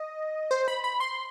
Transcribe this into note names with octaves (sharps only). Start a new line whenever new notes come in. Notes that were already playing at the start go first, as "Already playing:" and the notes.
Already playing: D#5
C5
B5
B5
C6